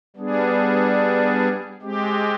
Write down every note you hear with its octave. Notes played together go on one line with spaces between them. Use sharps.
G3 B3 D4 G#4
G#3 C4 G4